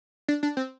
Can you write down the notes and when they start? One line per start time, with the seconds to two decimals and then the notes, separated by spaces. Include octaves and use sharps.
0.28 D4
0.43 D4
0.57 C4